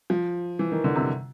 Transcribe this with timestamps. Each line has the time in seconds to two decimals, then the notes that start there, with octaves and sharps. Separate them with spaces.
0.10 F3
0.59 E3
0.72 D#3
0.84 D3
0.95 C3